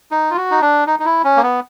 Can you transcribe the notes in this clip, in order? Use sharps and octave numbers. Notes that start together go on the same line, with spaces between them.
D#4
F4
F#4
D#4
D4
D#4
D#4
E4
C#4
A#3
B3